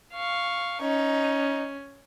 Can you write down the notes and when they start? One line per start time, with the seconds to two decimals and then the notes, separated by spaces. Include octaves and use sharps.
0.13 F5 C#6
0.82 C#4 D#4